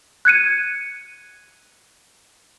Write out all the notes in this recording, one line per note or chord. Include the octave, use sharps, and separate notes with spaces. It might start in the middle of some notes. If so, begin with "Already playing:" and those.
F#6 G#6 C#7 D#7